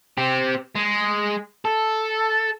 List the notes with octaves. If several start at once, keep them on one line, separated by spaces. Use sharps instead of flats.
C4 G4
G#3
A4